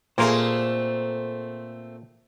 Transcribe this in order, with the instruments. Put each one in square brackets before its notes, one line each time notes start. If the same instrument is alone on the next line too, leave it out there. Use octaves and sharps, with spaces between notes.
[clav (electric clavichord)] A#2 A#3 A#4 [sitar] A3 C4 [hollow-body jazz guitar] G#4 C5